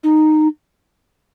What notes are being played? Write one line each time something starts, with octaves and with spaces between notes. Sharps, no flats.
D#4